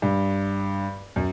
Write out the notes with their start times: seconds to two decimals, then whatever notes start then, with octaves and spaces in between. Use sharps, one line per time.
0.02 G2
1.16 F#2